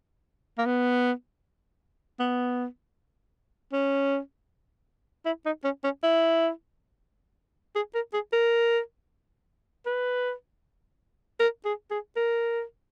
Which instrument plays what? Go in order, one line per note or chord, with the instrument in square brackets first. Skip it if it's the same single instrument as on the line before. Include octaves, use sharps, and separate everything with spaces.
[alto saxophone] A#3
B3
B3
C#4
E4
D#4
C#4
C#4
E4
G#4
A#4
G#4
A#4
B4
A#4
G#4
G#4
A#4